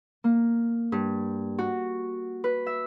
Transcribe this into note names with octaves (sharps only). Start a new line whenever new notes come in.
A#3
G2
F#4
B4
E5